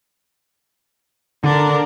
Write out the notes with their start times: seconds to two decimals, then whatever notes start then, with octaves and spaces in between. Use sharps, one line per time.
1.44 D3 D4 A#4